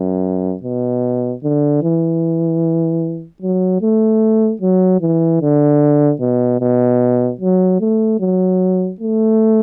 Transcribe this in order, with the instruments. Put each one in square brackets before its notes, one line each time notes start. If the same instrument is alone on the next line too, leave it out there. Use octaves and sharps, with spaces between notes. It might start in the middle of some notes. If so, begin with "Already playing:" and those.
Already playing: [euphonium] F#2
B2
D3
E3
F#3
A3
F#3
E3
D3
B2
B2
F#3
A3
F#3
A3